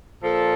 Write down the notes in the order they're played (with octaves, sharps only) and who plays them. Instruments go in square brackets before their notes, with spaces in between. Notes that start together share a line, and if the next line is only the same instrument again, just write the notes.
[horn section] A#2 F3 A4